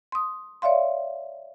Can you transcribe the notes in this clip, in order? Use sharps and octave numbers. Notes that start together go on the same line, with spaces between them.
C6 D#6
C#5 D5 E5 F5 C6